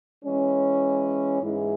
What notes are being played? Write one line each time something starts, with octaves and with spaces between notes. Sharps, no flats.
E3 G#3 C#4
G#2 E3 G#3 E4